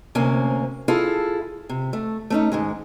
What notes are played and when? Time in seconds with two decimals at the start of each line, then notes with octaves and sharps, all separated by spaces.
0.15 D2 C3 A#3 C#4 G#5
0.88 E4 F4 G#4 A4
1.69 C3
1.93 A3
2.30 A3 C#4 D#4
2.52 G#2 D#3 G#3